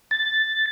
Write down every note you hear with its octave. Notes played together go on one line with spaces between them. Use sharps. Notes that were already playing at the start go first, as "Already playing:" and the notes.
A6